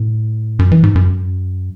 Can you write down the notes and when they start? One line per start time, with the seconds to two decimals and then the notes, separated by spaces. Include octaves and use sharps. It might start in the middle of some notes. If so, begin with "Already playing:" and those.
Already playing: A2
0.59 F#2
0.72 E3
0.83 G#2
0.95 F#2